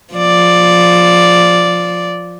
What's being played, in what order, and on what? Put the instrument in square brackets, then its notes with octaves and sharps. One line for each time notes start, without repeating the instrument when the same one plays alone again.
[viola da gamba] F3 D5